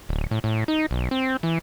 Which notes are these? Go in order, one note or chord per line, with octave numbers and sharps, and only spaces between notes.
D1
A2
A2
D#4
B1
C4
E3